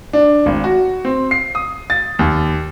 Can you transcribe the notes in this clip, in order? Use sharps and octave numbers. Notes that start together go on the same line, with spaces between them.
D4
G#1
F#4
C4
C7
D#6
A6
D#2